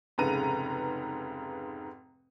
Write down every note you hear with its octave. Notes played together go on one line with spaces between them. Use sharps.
F1 G#2 C#3 B4 A#5 D#7